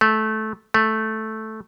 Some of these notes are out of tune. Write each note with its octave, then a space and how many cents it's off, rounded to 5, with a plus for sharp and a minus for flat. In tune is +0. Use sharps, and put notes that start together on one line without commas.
A3 -15
A3 -5